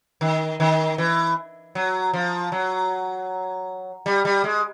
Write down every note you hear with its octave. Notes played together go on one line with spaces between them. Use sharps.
D#3
D#3
E3
F#3
F3
F#3
G3
G3
G#3